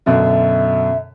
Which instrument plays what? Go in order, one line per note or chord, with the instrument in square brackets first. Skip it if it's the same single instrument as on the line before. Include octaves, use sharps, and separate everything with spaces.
[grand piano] F#2 B2 D3 [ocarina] E5